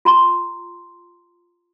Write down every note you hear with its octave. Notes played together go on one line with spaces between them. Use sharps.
F4 A#5 C6